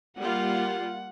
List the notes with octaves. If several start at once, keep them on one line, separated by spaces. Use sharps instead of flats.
G3 A#3 F4 F#5